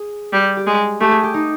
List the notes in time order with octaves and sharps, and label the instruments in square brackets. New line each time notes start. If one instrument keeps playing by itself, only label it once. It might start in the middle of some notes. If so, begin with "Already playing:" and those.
Already playing: [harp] G#4
[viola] G3
[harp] G4
[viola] G#3 [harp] G#4
[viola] A3 [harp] G4
[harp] G#4
G4
D#4